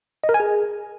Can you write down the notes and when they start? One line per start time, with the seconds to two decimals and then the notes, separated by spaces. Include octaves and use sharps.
0.24 D#5
0.29 A#4
0.34 G#5
0.40 G#4